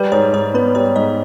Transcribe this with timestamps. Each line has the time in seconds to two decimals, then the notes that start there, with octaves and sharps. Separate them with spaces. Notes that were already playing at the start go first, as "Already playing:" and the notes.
Already playing: G3 B4
0.12 G#2 C#5
0.33 G#2 C#5
0.54 B3 B4
0.75 G3 C#5
0.96 G#2 D#5